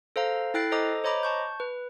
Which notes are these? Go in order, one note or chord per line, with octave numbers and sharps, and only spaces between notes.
A4 C5 F5 A#5
E4 A4 G5 F#6 A6 C7
A4 C5 D#5 A#5 D6 D#6
C5 C#5 D#5 A#5 B5 D6
A5 C#6 G6
B4